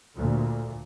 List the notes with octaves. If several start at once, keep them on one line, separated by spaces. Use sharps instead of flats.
D2 A#2